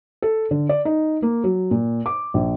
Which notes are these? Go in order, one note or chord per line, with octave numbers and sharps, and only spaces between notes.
A4
D3
D5
D#4
A#3
F#3
A#2
D6
A#1